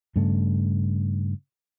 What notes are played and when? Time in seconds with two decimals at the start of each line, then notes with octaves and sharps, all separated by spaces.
0.16 G2 C#3 A3